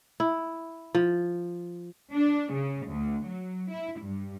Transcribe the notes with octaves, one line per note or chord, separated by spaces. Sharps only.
E4
F3
D4
C#3
D2
F#3
E4
G2